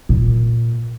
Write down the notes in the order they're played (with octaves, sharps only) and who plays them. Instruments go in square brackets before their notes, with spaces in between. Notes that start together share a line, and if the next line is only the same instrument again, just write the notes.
[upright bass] A#2